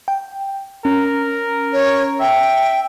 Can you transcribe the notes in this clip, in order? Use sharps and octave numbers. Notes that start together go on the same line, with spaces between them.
G5
C#4 A#4
C#5
E5 G5